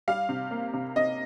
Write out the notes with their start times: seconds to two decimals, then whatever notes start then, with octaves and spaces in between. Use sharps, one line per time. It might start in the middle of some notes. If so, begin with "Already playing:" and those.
0.08 G3 F5
0.29 C3
0.51 A#3
0.74 C3
0.96 C3 D#5